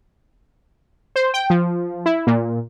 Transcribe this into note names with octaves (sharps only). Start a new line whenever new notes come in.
C5
G5
F3
E4
A#2